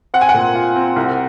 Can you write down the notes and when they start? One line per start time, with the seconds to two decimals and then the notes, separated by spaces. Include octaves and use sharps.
0.14 C4 F#5
0.21 G#5
0.29 F#5
0.34 A#2
0.55 F4
0.76 C4
0.96 C2